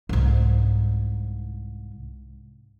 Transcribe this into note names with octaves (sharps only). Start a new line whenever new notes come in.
C2 G#2